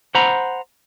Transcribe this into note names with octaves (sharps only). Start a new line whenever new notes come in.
C5 F#5 A#5 B5